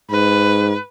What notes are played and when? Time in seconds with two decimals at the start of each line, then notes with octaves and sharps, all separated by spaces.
0.11 G#2 B4